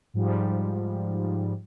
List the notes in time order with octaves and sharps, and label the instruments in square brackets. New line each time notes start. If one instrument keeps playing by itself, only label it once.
[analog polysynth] G#2 F3 G3